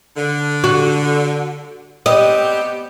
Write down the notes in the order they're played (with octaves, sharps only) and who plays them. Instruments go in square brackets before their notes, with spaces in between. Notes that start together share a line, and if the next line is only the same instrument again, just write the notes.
[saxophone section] D3
[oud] F#4
[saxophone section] B3 C4 G4 [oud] D#5